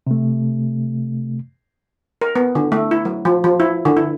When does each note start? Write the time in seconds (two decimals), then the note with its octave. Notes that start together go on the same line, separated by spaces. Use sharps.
0.07 C3 A3
2.22 A#4
2.36 B3
2.55 D3
2.72 A3
2.91 E4
3.05 F#3
3.25 F3
3.44 F3
3.60 E4
3.85 D3
3.97 E4